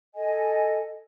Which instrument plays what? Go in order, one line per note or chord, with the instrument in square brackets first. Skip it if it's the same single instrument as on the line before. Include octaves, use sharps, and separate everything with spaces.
[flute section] A4 D#5 G#5